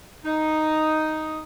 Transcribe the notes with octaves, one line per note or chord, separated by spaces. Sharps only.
D#4